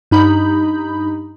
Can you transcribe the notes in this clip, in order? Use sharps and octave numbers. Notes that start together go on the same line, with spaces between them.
G2 D#4 B5 G6